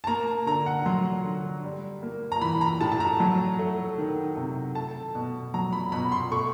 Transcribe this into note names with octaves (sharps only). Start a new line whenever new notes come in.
A5
A#3 A#5
D3 A#5
F#5
F#3 C6
D3
G3
A#3
A#5
E3 B5
A#5
A2 A5
A5
A#5
F#3
A3
D#3
C3
A3 A5
B2
F#3 A#5
B5
B2 B5
C6
A3 C#6